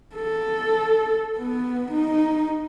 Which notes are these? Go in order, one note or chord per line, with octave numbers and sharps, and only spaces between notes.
A4
B3
D#4